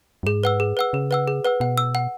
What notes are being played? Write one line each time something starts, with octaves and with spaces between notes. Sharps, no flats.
F#2
G#2 G#4
B4 F#5 E6
G#4
B4 F#5 E6
C#3 G#4
B4 F#5 E6
G#4
B4 F#5 E6
B2 F#5
E6
F#5